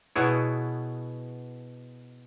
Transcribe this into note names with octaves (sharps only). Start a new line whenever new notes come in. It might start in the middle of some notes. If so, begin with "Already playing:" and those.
B2 B3 E4 G#4 C#5